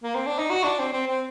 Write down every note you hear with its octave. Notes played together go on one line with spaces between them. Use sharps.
A#3
C4
D4
D#4
F#4
D4
C4
C4
C4